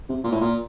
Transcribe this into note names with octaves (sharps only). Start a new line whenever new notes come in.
C3
A#2
A2
A#2